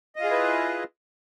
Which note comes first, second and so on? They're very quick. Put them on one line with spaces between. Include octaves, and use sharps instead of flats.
D#5 F4 G#4 E4 B4